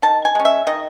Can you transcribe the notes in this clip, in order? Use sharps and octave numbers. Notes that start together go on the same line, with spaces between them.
D#3 A5
G#5
G#3 C#4
E5
D#3 D#5